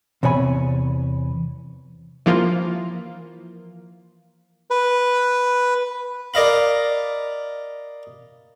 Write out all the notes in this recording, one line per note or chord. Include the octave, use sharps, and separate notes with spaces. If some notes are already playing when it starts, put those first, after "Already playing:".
E2 C3 C#5 G#5 B5
E3 F3 A#3 F4
B4
A#4 D5 D#5 F5 B5